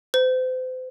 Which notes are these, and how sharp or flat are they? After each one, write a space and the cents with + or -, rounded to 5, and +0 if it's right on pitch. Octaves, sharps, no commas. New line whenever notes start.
C5 -35